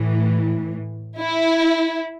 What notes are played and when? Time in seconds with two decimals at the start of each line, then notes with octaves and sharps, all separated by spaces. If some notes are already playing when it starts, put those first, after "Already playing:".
Already playing: A2 E3
1.17 E4